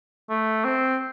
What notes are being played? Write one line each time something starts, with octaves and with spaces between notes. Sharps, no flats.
A3
C4